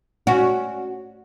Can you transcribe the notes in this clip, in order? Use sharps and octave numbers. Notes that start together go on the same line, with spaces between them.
C#4 F#4